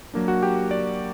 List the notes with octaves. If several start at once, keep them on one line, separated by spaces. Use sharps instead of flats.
F#3 A#3 D4
F#4 F#5
G4 G5
D5